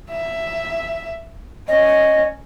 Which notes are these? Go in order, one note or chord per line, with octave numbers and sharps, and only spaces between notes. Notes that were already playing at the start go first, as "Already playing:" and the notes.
E5
C#4 D#5